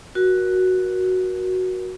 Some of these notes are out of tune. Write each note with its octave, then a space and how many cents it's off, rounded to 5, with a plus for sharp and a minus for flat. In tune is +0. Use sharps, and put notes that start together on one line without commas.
F#4 +0 A#4 +35